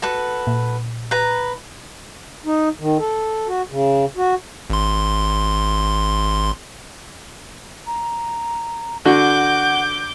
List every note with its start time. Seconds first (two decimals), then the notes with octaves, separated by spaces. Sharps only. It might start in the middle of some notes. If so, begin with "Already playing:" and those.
0.02 F#4 A4 B4
0.47 A#2
1.11 B4 A#5
2.46 D#4
2.79 D#3
2.99 A4
3.48 F#4
3.70 C#3
4.17 F#4
4.70 G#1 C6
7.87 A#5
9.05 D3 F#4 F#5 D6 G6